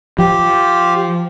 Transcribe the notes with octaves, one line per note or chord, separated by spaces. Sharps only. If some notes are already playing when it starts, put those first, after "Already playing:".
F3 G4